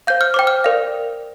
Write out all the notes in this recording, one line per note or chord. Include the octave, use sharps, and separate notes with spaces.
C5 F5 G6
F6
C5 G5 D6
F6
A#4 D5 F5